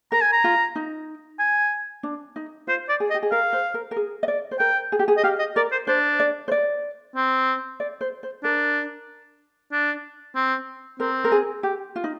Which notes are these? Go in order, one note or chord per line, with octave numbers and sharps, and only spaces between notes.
A#4 A#5
G#5
A#5
F4
D#4
G#5
D4
D#4
F4 C5
D5
G#4
D#5
G4
G#4
A#4 F5
C5
A#4
A#4
G#4
D#5
D5
C5
A#4 G5
G#4
G4
G#4
D#5
G4 F5
D#5
A#4 D5
C5
D4 C5
D5
C5
D5
C4
D5
C5
C5
D4 A#4
D4
C4
C4 A#4
A#4
G#4
G4
F4
D#4